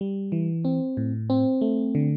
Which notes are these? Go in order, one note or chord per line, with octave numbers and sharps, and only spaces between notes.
G3
E3
C4
A2
C4
A3
D3